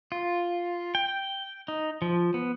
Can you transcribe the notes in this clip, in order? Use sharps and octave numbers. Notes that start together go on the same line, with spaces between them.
F4
G5
D#4
F3
B3